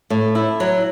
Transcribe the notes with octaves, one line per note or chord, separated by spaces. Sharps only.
A2
E4
F#3